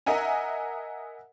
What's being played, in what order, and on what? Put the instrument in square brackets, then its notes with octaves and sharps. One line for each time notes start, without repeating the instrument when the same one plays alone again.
[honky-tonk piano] A#4 D#5 E5 F#5 G#5 A#5